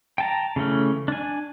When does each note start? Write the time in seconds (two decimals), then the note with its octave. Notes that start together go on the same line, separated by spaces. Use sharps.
0.18 G5 A5 A#5
0.56 C#3 E3 A3 C#4
1.08 D4 G#5